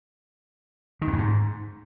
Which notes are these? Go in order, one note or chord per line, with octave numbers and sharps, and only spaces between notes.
D#3
F2
F#2
G#2